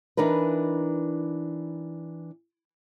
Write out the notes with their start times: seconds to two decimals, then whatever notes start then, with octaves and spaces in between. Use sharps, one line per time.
0.17 E3 D4 D#4 A#4 B4